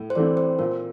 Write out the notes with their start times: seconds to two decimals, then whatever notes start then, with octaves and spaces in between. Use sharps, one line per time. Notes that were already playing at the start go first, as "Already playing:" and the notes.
Already playing: A2
0.10 C5
0.15 E3 A3 C4 D5
0.37 C5
0.59 A#2 A#4